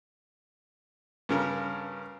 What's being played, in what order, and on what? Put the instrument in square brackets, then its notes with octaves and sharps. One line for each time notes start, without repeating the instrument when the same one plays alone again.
[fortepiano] G2 C#3 A#4